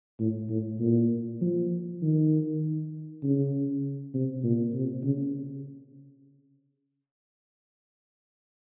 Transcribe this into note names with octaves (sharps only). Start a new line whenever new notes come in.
A2
A2
A#2
F3
D#3
C#3
C3
A#2
C3
C#3